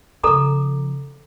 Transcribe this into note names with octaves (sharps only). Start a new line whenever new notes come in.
C#3 F3 A4 A#5 D6